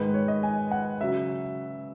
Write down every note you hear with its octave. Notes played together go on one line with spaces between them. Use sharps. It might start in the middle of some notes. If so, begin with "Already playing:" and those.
Already playing: G#2 D#3 G#3 B4
C#5
D#5
G#5
F#5
C#3 F#3 E5